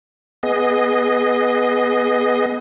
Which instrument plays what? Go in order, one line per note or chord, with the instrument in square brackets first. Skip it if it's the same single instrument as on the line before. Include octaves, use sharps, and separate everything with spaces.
[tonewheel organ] B3 G#4 D#5